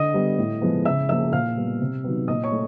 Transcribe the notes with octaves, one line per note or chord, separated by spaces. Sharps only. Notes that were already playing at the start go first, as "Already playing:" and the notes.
Already playing: D3 D#5 D#6
G3 B3
A2
F3 G#3 B3
C#3 E5 E6
F3 A#3 E5 E6
A#2 F5 F6
G3 B3
C3
D#3 F#3 B3
A#2 D#5 D#6
C#5 C#6
A3